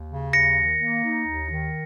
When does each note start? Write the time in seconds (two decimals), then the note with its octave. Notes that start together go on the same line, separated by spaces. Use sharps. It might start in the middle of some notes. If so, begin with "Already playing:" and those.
Already playing: D#2
0.10 C#3
0.33 D#2 A#6 C#7
0.57 D#3
0.80 A#3
1.04 D#4
1.27 D#2
1.50 D#3